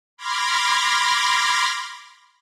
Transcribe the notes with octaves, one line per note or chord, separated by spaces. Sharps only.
B5 C6 D6 F6 G#6 A#6